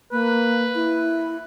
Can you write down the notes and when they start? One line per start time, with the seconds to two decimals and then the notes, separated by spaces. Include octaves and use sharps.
0.12 A#3 B4
0.75 E4